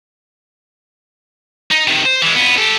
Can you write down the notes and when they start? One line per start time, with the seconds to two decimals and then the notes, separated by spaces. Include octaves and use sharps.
1.72 D#4
1.88 C3 D#3
2.05 C5
2.22 E3 G#3
2.35 F2 B3
2.58 G4 A4